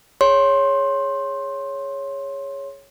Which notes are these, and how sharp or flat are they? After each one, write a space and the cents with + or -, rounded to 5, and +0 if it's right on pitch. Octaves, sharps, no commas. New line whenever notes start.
G#4 +0 C#5 +0 C6 +15